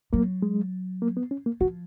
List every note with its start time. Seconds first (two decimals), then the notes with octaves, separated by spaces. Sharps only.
0.13 F#3 A#3
0.42 G#3
1.02 A#3
1.17 B3
1.31 C#4
1.46 A#3
1.60 F3 F#4